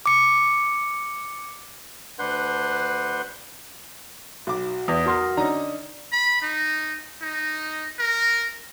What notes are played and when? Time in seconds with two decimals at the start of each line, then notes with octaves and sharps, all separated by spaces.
0.06 D6 C#7
2.19 D2 D4 B4 F#5 C6 G6
4.47 B1 F#4 D6
4.88 E2 D#6 A#6
5.06 F#4 A#4 F#5 C6 F6
5.37 D3 C#4 D#4 D5 A#5
6.13 B5
6.42 D#4
7.22 D#4
7.99 A#4